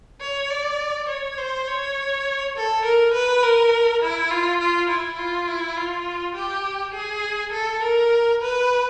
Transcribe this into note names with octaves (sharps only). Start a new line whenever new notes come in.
C#5
D5
C#5
C5
C#5
A4
A#4
B4
A#4
E4
F4
F4
E4
F4
E4
F4
G4
G#4
A4
A#4
B4